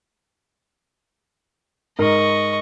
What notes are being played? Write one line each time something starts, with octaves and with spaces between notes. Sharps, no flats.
G#2 A#4 D#5 C#6